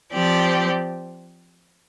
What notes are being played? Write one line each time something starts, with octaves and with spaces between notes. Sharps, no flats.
F3 C4 G4 D5